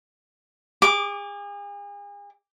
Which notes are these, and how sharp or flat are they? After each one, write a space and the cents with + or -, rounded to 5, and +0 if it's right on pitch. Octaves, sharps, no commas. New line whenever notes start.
G#4 -40 D6 -10